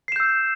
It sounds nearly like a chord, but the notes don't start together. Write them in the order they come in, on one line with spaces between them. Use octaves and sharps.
C7 E7 G6 E6